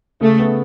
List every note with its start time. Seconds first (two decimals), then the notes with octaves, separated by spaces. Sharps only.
0.21 C#3 A3
0.39 B3